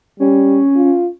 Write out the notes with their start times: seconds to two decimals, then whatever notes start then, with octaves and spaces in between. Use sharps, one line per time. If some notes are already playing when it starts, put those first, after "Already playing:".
0.20 G3 C#4
0.76 F4